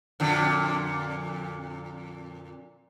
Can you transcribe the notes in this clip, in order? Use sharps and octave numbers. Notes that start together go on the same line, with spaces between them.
F2 A#2 D3